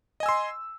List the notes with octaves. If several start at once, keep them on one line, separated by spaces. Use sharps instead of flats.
D#5 G#5 C6 E6